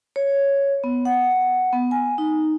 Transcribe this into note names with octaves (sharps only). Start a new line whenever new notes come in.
C#5
B3
F#5
B3
G#5
D#4